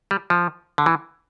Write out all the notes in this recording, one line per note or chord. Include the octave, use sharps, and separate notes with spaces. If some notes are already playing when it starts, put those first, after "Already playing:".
G3
F3
D3
E3